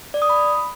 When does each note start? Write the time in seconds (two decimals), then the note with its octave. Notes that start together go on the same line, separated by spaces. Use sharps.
0.14 D5
0.22 D#6
0.30 B5